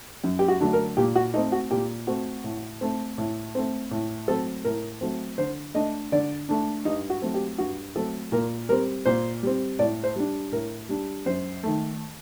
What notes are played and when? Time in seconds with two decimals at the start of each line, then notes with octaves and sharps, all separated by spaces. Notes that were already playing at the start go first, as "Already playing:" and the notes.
0.24 F#2
0.39 G4
0.48 F#4
0.60 D3 F#3 A3 D4
0.73 A#4
0.97 A#2 G4
1.15 F#4
1.34 A3 C4 D#4
1.52 F#4
1.71 A#2 G4
2.07 A3 C4 F#4
2.44 A2
2.81 A3 C4
3.18 A2
3.55 A3 C4
3.91 A2
4.28 F#3 A3 C4 A4
4.65 A2 A#4
5.01 F#3 A3 C4
5.38 D3 C5
5.75 A3 D4 D#5
6.12 D3 D5
6.49 A3 D4
6.85 G2 D#4
7.10 F#4
7.22 F#3 A3 C4
7.34 G4
7.58 G2 F#4
7.96 F#3 A3 C4 A4
8.32 A#2 A#4
8.69 G3 C4 A#4
9.05 A#2 C5
9.43 G3 C4
9.79 A2 D5
10.04 C5
10.16 G3 D4
10.52 A2 A#4
10.89 G3 D4
11.26 F#2 C5
11.63 D#3 A3